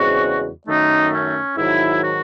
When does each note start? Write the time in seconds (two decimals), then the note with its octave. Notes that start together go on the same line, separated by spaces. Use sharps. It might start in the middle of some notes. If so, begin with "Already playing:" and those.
Already playing: E2 C#3 G#3 C4 F#4
0.67 F#2 D#3 A3 D#4
1.12 C#4
1.56 G#2 D#3 F#3 E4
2.02 F#4